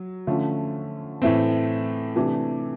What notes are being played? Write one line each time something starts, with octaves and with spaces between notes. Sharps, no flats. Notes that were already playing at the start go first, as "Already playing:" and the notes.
Already playing: F#3
D3 F3 A3 C#4
A2 E3 A3 C4
C3 E3 A3 D4 G4